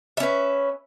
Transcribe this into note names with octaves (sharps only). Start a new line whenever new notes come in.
C#4 B4 E5